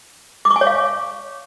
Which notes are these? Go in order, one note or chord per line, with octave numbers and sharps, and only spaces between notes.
D6
C#6
G#5
C#5
F5